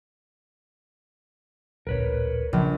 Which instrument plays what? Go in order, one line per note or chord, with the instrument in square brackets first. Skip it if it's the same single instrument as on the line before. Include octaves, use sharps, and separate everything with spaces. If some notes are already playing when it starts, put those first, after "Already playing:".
[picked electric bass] D1 A#1 [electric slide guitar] A#4 B4 C#5
[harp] A#1 [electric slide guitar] C#3 F#3